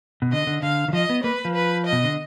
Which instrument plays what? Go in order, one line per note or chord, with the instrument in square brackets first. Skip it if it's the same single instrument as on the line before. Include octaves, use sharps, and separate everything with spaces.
[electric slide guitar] B2
[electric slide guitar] D3 [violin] D#5
[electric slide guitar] D3
[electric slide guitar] D3 [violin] F5
[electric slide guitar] D#3
[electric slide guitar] F3 [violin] D#5
[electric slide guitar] B3
[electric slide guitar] A#3 [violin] B4
[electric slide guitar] F3
[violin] B4
D#5
[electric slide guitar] B2
D3